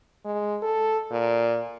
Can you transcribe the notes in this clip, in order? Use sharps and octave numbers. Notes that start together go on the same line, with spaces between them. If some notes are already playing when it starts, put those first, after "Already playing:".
G#3
A4
A#2